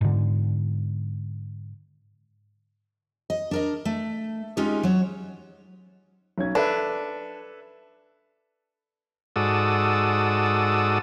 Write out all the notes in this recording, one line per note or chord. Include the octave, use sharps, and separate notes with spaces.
G#2 D3
D#5
D4 A#4 D#5
A3
G#3 C#4 D#4 F4 G4
F#3 C#5
B1 C#4 G#6
D4 A4 B4 E5
G#2 F#4 A4 D5 D#6 E6